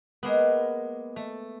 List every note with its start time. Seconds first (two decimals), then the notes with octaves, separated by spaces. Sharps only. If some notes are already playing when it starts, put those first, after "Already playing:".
0.23 G#3 A#3 B3
1.16 A3